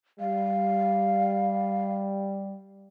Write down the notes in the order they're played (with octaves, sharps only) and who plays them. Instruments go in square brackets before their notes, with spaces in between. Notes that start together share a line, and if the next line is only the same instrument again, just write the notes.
[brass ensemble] G3 [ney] F5